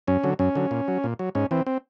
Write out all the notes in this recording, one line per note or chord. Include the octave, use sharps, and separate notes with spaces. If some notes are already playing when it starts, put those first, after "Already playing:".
F#2 C#4
D3 F#3
F#2 C#4
D3 F#3
A#2
F#3
A#2
F#3
G#2 C#4
E3 C4
C4